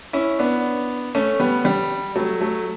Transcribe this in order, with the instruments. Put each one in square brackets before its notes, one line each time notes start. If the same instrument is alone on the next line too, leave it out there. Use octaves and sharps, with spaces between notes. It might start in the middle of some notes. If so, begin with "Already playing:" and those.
[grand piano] C#4 E4
B3 D4
A3 C#4
G3 B3
G3
F#3 A3
F#3 A3